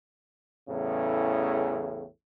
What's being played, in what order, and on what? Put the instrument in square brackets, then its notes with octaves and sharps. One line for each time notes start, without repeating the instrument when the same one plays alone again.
[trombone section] A1 E2 A2 C#3